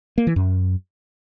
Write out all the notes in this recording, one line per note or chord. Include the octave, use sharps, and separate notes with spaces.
A#3
E3
F#2